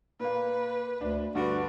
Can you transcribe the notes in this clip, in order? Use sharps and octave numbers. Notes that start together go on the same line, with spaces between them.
A#2 A#3 B4
D2 D4
G2 D3 D4 F#4 B4